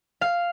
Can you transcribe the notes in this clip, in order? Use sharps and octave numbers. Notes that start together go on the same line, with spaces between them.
F5